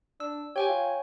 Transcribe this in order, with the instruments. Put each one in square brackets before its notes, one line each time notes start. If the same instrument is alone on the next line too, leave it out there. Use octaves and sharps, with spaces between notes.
[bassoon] D4 [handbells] E6
[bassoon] G4 [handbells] C#5 G5 G#5
[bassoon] F4